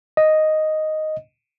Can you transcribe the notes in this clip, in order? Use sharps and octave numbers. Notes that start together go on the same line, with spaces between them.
D#5